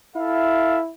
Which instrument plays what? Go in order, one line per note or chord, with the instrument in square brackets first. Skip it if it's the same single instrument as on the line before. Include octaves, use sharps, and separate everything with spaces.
[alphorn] E4 [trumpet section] A4 E5 F5